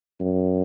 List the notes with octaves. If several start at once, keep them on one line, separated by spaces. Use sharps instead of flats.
F#2